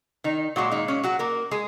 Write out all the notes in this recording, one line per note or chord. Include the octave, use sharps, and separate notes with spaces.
D#3 D#4
A#2 F#3 G#3 F#4
D#3 D#4
C#4
F#3 F#4
A#3 A#4
G#3 G#4